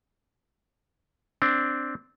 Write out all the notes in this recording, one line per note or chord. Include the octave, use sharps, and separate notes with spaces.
C4 D4